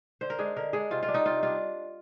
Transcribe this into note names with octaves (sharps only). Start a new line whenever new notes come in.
D3 C5
A#4
G#3 D4 G#4
D3 A#4
G#3 D4 G#4
C3 F4
F4
G3 D4
D#4
C3 F4
G3 D4 F4